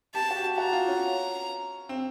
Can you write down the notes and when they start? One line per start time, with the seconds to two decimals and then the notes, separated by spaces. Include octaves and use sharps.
0.14 G4 A5
0.31 F#4
0.36 G4
0.58 F#4 A#5
0.72 F4
0.88 C#4
1.89 C4